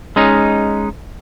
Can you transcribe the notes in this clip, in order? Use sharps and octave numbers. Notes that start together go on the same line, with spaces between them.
G#3 C#4 D#4